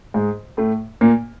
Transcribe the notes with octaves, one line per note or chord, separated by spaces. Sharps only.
G#2 G#3
A2 A3
A#2 A#3